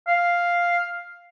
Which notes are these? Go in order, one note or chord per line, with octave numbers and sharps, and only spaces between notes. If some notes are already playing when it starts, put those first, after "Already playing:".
F5